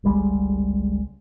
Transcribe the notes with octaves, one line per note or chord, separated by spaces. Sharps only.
G1 C#2 G3 G#3